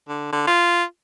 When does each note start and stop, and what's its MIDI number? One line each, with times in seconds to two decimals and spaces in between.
0.08 0.31 50
0.32 0.46 50
0.47 0.84 65